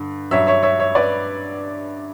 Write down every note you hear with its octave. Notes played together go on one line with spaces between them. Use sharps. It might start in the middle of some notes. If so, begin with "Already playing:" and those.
Already playing: G2 D3
G2 F#3 C#5 E5
C#5 E5
C#5 E5
C#5 E5
B4 D5